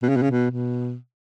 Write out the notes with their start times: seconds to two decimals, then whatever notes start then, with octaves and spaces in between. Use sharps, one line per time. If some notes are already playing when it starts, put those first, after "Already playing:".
0.03 B2
0.09 C#3
0.16 B2
0.22 C#3
0.30 B2
0.51 B2